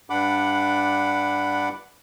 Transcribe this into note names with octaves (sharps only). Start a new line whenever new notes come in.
G2 D4 F#5 B5 D6